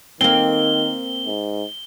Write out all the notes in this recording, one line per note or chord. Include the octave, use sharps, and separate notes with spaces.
D#3 A#3 C4 G7
G#2